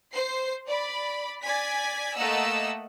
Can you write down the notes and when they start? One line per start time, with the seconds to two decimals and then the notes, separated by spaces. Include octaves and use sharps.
0.13 C5 C7
0.67 D5 B5
1.41 D5 G#5 G#6 B6
2.15 A3 A#3 D#5 F#5 E6